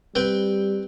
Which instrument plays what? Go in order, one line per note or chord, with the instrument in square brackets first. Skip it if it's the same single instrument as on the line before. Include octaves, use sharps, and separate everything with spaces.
[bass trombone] G3 [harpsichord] C4 B4 G5